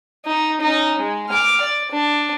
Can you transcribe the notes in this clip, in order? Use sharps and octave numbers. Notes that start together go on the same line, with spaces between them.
D#4
C#4 D#4
G#3
D6 F6
D5
D4